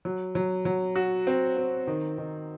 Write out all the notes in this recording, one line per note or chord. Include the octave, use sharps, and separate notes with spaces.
F#3
F#3
F#3
F#4
C4
C4
D#3
D#3